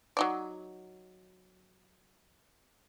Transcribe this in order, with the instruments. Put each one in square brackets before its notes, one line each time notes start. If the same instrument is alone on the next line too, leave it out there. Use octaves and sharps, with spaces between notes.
[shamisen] F#3 D#4 D5